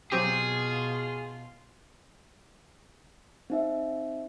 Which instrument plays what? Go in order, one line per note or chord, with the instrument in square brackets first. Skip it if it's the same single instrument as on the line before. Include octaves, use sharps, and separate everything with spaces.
[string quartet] B2 F4 [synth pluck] F#3 C4 G4 [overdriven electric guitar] G#4
[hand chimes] C4 D#4 E5